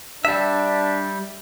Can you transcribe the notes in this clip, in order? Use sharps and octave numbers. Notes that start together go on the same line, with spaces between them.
G3 D4 E5